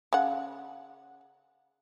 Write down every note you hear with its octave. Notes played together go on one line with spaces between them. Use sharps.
C#3 F#5